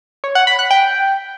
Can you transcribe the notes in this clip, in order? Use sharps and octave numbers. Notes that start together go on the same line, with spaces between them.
C#5
F#5
B5
F#6
G5